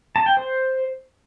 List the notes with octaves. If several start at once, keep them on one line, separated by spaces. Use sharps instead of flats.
A5
G5
C5